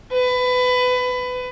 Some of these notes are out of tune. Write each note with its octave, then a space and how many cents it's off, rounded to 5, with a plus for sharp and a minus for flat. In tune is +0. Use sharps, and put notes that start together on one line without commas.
B4 +20